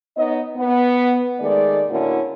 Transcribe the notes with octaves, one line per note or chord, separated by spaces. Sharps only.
B3 D#4 C#5 D#5
B3
D#3 G#3 A3 G#4 D5
A2 D3 A#3 C#4 E4 F#4